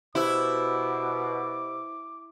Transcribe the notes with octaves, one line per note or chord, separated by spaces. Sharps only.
B2 E4 G4 C5 D6 E6